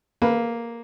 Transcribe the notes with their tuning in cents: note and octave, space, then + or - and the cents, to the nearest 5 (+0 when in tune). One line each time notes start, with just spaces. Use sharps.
A#3 +0 G#4 +45 B4 -10